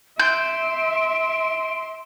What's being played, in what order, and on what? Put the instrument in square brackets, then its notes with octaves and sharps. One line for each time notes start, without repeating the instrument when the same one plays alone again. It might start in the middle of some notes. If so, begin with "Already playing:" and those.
[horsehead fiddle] E5 [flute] C6 [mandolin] G6 [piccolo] D7